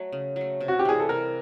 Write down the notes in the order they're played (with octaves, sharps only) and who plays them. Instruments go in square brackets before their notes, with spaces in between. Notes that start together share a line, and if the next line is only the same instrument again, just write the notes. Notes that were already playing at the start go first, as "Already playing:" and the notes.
Already playing: [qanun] F#3 A3
C#3
F#3 A3
C3
[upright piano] F#4
G4
[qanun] E3 G3 [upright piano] G#4
[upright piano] A4
[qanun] C3 [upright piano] A#4